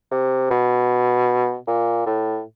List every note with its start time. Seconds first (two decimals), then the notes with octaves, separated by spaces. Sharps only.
0.11 C3
0.51 B2
1.68 A#2
2.06 A2